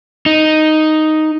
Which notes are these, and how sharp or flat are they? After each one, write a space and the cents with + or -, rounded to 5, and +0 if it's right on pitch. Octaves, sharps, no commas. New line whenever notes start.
D#4 +0